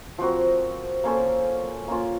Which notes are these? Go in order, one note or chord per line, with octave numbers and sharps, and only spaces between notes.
F3 C4 F#4 A#4
A#3 C#4 A4 C5
A#3 C#4 F4